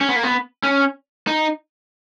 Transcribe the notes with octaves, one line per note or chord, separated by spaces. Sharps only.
C#4
B3
A#3
B3
C#4
D#4